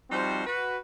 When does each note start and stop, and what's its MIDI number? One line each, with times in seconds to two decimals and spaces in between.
0.10 0.46 53
0.10 0.46 55
0.10 0.46 60
0.10 0.46 63
0.10 0.46 66
0.10 0.46 72
0.47 0.78 66
0.47 0.78 71